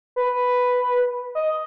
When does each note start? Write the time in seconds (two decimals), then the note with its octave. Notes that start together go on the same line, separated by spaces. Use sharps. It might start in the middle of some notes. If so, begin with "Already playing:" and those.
0.16 B4
1.35 D#5